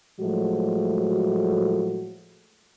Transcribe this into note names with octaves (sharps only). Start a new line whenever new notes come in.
A2 F3 F#3 G#3 A3 F#4